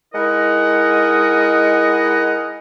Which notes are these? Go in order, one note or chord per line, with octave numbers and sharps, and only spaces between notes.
G#3 D#4 E4 A#4 D#5 F#5